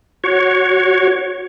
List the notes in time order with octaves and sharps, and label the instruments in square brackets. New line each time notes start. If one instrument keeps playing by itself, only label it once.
[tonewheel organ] F#4 C#5